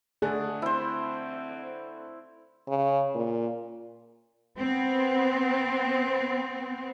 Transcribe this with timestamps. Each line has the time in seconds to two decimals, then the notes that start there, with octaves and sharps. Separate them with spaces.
0.22 D3 A3 D4 G#4 F#6
0.62 C4 E4 C5
2.68 C#3
3.15 A#2
4.57 B3 C4